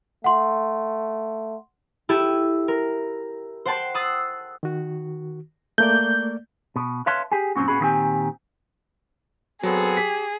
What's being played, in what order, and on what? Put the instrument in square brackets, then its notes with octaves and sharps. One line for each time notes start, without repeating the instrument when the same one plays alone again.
[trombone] A3 [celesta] F#5 C6
[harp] E4 G4 A4 G#6 D#7 E7
A#4
C5 F#5 G5 A5 C6
D#6 E6 F#6 A6 C7
[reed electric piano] D#3 F#4
[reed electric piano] A3 A#3 D5 [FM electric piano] G6
[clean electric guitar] B2
B4 C#5 E5 F5 A5 C6
G4 G#4
F#2 A#2 A3 C4 C#4 F#4
A#2 B3 C#4 F#4 G#4 B5
A#2 D#3 G3 C4 G4 G#5
[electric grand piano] F#3 [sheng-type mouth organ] B3 C4 A4 [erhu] G#4
[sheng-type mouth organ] G4 [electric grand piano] B6